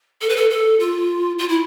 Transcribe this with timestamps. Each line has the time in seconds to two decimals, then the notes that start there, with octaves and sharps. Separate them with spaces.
0.22 A4
0.29 B4
0.36 A4
0.50 A4
0.80 F4
1.39 F4
1.49 E4